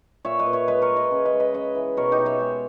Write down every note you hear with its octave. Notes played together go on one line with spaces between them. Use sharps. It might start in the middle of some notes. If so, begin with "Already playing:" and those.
A#2 C#5 E5
B4 D#5
A#2
C#5 E5
G#3 B4 D#5
A#4 C#5
G#3
B4 D#5
C#3
B4 D#5
G#3
B4 D#5
C#3 B4 D#5
E3
B2 A#4 C#5
D#4 G4
B2
C#5 E5
G#3